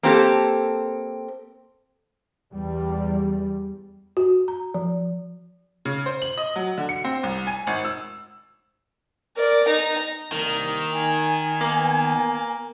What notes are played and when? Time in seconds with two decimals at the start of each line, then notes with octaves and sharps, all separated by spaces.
0.03 A#3 C4 G4 A4
2.53 E2 G3
4.17 F#4
4.48 A#5
4.74 F3
5.85 C#3
6.06 C5
6.22 F#7
6.38 D#5
6.56 F#3
6.78 D3
6.89 C#7
7.04 C4
7.23 C2
7.47 G#5
7.67 G#1
7.85 E6
9.37 A#4 D5
9.68 D#4 A#5
10.32 C2 D#3 A#3
10.92 D#4 G#5
11.61 A#3 B3